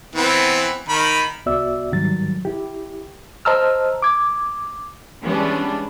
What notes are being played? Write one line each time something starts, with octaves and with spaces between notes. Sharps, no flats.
E3 B3 C4
D#3 B5
C2 B3 F#4 D5 E5 E6
G#2 D#3 F#3 G3 A6
E4 G4
C5 D#5 A5 A#5 E6 F6
D6 G#6
E3 G3 G#3 B3 C#4 D4